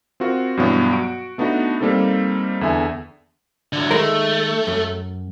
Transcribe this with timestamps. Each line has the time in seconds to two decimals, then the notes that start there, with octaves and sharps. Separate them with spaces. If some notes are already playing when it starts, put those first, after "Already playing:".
0.20 C4 F4 F#4 A#4
0.57 G2 B2 E3 F#3 B3
0.93 F#4 D7
1.38 A3 B3 D4 D#4 F#4
1.80 G3 A#3 C4 D#4 A4
2.61 E2 D3 E5 G#5
3.73 D3 F#3
3.91 D#3 G#3 A3 A#4
4.67 F#2